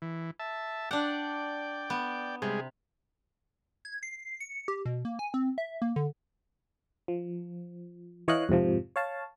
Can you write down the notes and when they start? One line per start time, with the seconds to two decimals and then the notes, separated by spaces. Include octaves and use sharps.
0.02 E3
0.40 E5 A5
0.91 D4 D5 F#5 G5
1.90 B3
2.42 C3 G3 G#3 G#4
3.85 G#6
4.03 C7
4.40 C#7
4.68 G4
4.86 B2
5.05 A#3
5.19 G#5
5.34 C4
5.58 E5
5.82 A#3
5.96 D3
7.08 F3
8.28 E3 C#5 D#5 F5 F#6
8.49 F2 G#2 C3 F3
8.96 C#5 F5 A5